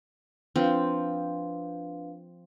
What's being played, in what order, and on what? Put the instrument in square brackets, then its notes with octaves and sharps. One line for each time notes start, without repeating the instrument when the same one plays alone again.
[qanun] F3 C4 [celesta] D4 B4 F5